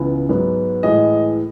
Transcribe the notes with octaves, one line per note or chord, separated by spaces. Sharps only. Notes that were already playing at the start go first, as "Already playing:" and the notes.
Already playing: C#2 C#3 E3 B3
G#2 F#3 B3
A2 E3 G#3 D#5